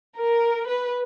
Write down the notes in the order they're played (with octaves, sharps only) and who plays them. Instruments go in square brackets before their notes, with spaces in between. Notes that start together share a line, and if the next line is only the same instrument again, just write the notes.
[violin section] A#4
B4